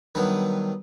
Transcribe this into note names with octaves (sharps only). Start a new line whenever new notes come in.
G2 D#3 F#3 B3 B4